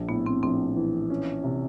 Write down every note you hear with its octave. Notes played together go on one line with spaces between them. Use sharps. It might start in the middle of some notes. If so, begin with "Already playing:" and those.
Already playing: A#1
A2 B3
C4
A#1 C4
E3
C#4
C3